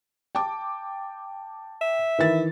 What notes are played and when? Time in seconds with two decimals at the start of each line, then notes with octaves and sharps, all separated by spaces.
0.35 G5 A5 D6
1.81 E5
2.19 D#3 E3 A6